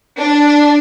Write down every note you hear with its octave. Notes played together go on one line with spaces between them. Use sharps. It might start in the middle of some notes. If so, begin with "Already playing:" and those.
D4